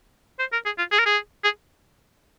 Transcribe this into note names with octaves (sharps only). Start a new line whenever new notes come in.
C5
A#4
G#4
F4
G#4
A#4
G#4
G#4